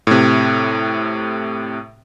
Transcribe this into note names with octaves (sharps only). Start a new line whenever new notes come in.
A2 C3